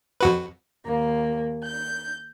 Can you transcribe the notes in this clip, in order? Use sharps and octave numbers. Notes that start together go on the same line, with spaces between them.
F2 F#4 B4
D#2 A#3
G6